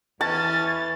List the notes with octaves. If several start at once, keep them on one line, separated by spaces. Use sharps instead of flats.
E2 E3 C#4 A5 A6